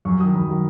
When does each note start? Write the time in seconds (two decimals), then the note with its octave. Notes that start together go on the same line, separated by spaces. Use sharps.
0.05 F#2 C#6
0.20 F#3 D#6
0.23 D#3
0.35 F#2 B5
0.49 D#3 F#3